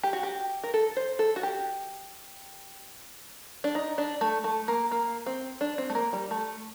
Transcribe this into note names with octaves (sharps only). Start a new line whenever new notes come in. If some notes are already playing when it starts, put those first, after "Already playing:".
G4
F#4
G4
A#4
A4
C5
A4
F#4
G4
D4
D#4
D4
A3
A3
A#3
A#3
C4
D4
C4
A3
A#3
G3
A3